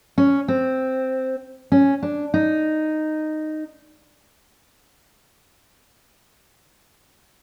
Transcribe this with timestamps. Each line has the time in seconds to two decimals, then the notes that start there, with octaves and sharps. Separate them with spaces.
0.18 C#4
0.48 C4
1.72 C#4
2.03 D4
2.34 D#4